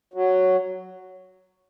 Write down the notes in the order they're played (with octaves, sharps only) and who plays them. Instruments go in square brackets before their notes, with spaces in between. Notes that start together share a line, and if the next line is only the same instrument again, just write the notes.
[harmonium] F#3